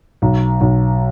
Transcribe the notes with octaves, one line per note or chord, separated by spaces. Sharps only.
B1
B1